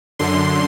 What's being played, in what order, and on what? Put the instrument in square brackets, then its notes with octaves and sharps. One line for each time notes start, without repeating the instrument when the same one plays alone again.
[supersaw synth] F#2 D3 C6